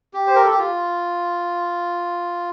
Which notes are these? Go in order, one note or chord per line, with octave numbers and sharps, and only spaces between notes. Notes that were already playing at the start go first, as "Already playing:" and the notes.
G4
C5
A#4
A4
G4
F4